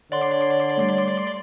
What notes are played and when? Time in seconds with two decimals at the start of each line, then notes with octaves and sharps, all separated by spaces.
0.12 D3 C#5 D5 F#5 C6
0.77 G3 A3